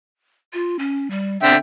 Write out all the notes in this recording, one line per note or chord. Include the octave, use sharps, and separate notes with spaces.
F4
C#4
G3
D3 C4 E5 G5